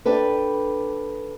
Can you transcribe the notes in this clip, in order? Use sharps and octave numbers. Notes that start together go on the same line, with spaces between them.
D4 G4 A4 B4